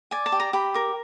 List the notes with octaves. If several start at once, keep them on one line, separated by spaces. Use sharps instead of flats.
D5 G#5
A5
G4
A#5
G4 B5
A#4 D6